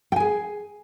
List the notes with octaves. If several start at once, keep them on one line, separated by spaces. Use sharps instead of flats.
G#4 G5 G#5